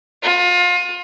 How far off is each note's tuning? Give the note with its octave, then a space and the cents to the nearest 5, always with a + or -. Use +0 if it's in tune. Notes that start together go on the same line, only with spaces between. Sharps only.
F4 +30